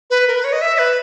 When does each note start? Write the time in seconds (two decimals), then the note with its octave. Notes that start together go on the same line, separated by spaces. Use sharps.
0.10 B4
0.27 A#4
0.35 B4
0.44 C#5
0.53 D#5
0.61 E5
0.78 B4